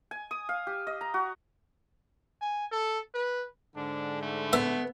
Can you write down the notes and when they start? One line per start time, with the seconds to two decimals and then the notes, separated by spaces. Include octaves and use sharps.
0.11 G#5
0.31 D#6
0.49 F5
0.67 G4
0.87 D#5
1.01 A#5
1.14 F#4
2.41 G#5
2.72 A4
3.14 B4
3.76 G#2 D3 D4
4.22 A3
4.53 B3 E5